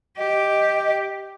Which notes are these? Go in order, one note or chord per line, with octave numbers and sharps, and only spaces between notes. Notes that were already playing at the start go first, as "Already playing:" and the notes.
G4 D#5